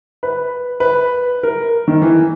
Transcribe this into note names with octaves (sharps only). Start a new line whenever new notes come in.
B4
B4
A#4
D#3
E3